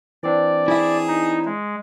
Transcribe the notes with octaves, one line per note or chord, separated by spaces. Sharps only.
E3 C4 D4 D5
E4 G#4 E5
D#4
G#3